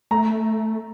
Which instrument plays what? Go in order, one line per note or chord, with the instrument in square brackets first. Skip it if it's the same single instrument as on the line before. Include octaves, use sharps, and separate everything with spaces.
[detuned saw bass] A3 [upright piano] A#5